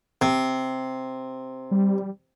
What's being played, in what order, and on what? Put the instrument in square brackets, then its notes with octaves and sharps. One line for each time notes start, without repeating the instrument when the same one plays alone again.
[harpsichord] C3
[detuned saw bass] G3